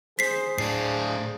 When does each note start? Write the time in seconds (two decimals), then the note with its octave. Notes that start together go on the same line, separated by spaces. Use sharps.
0.19 G#4 C5 B6 C7
0.58 A2 D4 C5 C7